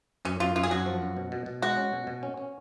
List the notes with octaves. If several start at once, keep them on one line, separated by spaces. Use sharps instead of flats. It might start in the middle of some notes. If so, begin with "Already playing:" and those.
F#2 C#4
F#2 F4
F#2 F4
G#4
F#2 F#4
F3
F#2
B2
B2
B2
G#3 F#4
C#4
B2
B2
C#4
C#4